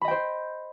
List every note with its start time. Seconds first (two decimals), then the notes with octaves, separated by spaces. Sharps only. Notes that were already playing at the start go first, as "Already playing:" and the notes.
0.01 B5
0.05 D#5
0.08 G5
0.11 C5